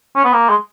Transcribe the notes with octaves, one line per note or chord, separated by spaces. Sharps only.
C#4
B3
A#3
G#3